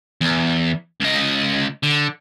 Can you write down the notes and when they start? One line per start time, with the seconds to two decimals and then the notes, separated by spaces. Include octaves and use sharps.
0.21 E2
1.01 C#2 D#5
1.83 D3